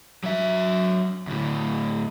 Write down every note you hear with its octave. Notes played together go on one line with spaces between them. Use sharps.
F#3 E5
D2 A2